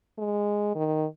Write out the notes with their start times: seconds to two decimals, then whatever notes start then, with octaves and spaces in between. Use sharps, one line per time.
0.18 G#3
0.75 D#3